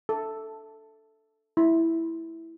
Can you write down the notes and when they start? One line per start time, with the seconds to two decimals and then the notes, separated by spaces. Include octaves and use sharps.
0.09 A4
1.57 E4